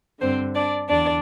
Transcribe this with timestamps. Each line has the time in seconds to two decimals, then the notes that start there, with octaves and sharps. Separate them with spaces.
0.20 G2 D3 C4 C5
0.55 D4 D5
0.89 E2 D3 D4 D5